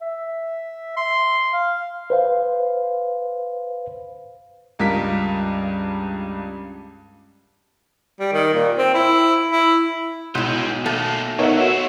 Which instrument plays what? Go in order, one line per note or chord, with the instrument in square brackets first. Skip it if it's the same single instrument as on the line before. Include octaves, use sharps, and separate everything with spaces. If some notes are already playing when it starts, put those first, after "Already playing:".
[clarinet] E5
C6
F5
[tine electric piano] B4 C5 F5
[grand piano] C#2 G2 F4 A#4 B6
[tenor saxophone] G3
D#3
A#2
C4
E4
E4
[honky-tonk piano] B1 [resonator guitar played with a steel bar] G#3 E4 [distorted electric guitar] B4 D#5 [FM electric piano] G6
[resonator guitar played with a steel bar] A3 A#3 A5 [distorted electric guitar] D#4 F4
[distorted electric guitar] C3 F#3 [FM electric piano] B3 D#4 A#4 [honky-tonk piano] C#5 E5 F#5
[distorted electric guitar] E4 C5 [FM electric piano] F#4